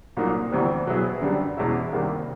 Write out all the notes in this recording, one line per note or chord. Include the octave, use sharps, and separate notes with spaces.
C2 A#2 F#3 A#3 D#4
D2 C3 E3 G3 B3
B2 F#3 B3 E4 G#4
F#2 D3 G3
E2 B2 G#3 C#4 E4
C2 C3 D#3 G3 A#3